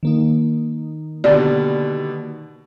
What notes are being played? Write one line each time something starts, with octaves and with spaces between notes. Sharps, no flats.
D#3 A#3 D#4
B2 D3 G3 D5